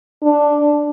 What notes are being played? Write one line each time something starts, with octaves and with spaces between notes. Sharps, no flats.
D4